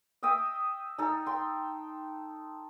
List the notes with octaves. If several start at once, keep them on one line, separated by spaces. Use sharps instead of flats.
D#5 E5 G5 D#6
D#4 A4
G5 C6